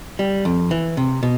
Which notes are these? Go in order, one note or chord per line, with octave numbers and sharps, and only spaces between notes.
G3
F2
E3
C3
B2